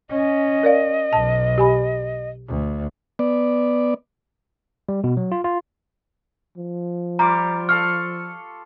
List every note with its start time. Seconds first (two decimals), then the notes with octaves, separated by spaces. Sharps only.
0.10 C#4 D#5
0.63 A#4 D5 F5
1.13 B1 A5
1.58 G4 G#5 B5
2.48 D2
3.19 B3 D5
4.89 G3
5.04 B2
5.17 F#3
5.32 F4
5.44 F4
6.57 F3
7.19 G3 F4 A#5 D6
7.69 A4 F5 C#6 F6